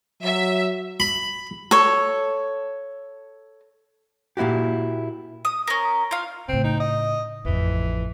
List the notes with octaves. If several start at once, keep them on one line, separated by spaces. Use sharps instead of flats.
F#3 E5
B5
A4 C#5
A#2 A#3 E4 F#4 G4
D#6
C#4 A#4
F4 F5
A2 C#3 C4
D#4
D#5
A1 F2 E3